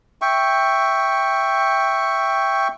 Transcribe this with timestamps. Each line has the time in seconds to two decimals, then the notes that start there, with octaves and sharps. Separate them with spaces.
0.22 E5 G5 C#6